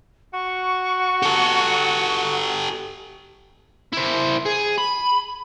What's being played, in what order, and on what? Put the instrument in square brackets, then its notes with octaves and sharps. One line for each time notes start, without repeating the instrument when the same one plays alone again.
[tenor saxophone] F#4 [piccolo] C#6
[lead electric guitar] G4 A4
[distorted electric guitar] E4 C5
G#4
B5